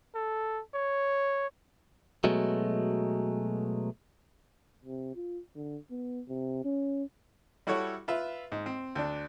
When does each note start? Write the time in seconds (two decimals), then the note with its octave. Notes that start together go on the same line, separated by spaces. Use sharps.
0.15 A4
0.74 C#5
2.24 B2 F#3 G#3 A3
4.85 C3
5.15 F4
5.56 D3
5.91 B3
6.29 C3
6.65 C#4
7.67 G3 E4 F#4 A4 C#5
8.08 F4 B4 E5
8.52 G#2
8.66 C4
8.95 D2 D4